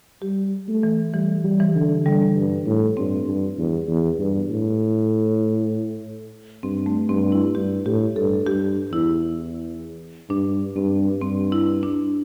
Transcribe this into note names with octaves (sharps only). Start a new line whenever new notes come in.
G3 G4
A3
E3
E3 G3
G3
E3
D3
D3 G3
G2
A2
G2 C4
G2
E2
E2
G2
A2
G2 C4
A3
G2 C4
E4
G2 G4
A2 G4
G2 A4
G2 G4
E2 E4
G2 D4
G2 C4
G2 C4
E4
D4